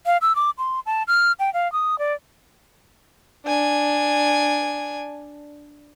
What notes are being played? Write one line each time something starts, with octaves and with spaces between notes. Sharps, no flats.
F5
E6
D6
C6
A5
F6
G5
F5
D#6
D5
D4 G#5